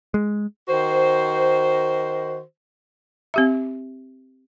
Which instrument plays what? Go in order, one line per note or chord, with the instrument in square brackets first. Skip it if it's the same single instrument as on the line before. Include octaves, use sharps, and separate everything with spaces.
[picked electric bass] G#3
[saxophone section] D#3 F#4 C5
[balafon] C4 G4 E5